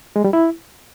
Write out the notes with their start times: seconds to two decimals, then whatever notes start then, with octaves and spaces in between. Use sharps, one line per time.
0.16 G#3
0.24 G3
0.33 E4